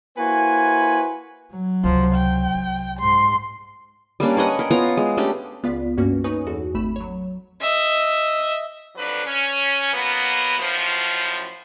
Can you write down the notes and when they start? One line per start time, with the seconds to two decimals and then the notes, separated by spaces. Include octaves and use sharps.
0.17 A#3 E4 F#4 B4 C5 G#5
1.52 F#3
1.84 C#2 C3 F3
2.15 G5
2.55 C2
3.00 G#2 C6
4.20 G3 A#3 C#4 D4
4.37 B4 C#5 D#5 F#5
4.59 A#4 G#5
4.71 B3 F4 C#5 A#5
4.97 G#3
5.17 A3 C#4 D4 G4
5.63 C#2 B3 F4 D5 F5 B6
5.98 G2 A#3 C#4 F#4
6.24 D#4 B4 C#5 G#5 C#6 D#6
6.47 E2 F#4 A4
6.74 G#1 A3 B5 E7
6.96 F#3 C#5
7.61 D#5 E5
8.95 F2 F#3 D4 B4
9.26 C#4
9.92 F#3 A#3 B3
10.58 F#2 A2 F3